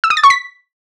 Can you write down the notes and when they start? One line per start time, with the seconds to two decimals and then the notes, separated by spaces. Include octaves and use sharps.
0.04 E6
0.10 D#6
0.17 A6
0.24 C#6
0.30 B6